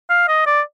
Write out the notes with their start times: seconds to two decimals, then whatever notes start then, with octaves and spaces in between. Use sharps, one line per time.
0.10 F5
0.28 D#5
0.46 D5